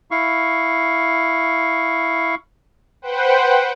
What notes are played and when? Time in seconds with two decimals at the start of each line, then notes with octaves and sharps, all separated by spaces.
0.11 E4 F5 C#6
3.02 B4 C5 F#5 G5